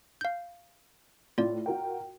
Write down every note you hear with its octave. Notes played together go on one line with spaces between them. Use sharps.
F5 G6
A2 F4 D5
F#4 A#4 G5